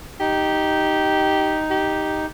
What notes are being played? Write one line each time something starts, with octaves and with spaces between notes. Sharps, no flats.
D#4 G4
G4